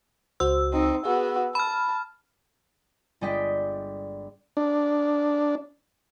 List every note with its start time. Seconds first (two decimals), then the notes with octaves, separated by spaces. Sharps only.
0.40 C#2 F#4 C5 E6
0.73 C4 D#4
1.05 B3 F#4 G#4
1.55 A5 B5 F6
3.21 G1 G#3 D4 D#5 G5 B6
4.57 D4